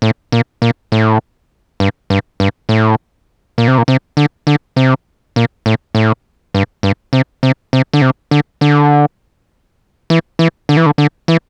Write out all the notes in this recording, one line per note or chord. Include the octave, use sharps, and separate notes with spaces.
A2
A#2
A#2
A2
G2
G2
G2
A2
A#2
C3
A#2
C3
D3
D3
C3
A#2
A2
A2
G2
G2
C3
C3
C3
D3
C3
D3
D3
E3
E3
D3
E3
D3
D3
E3